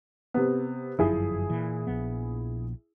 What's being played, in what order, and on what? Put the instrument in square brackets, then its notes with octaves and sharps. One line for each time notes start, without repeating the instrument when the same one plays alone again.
[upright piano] C3 B3
[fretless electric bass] G1 F#2 F3 [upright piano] E4 G#4
[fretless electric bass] A#2 E3
A#1 F3 B3